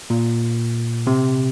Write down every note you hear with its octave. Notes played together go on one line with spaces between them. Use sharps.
A#2
C3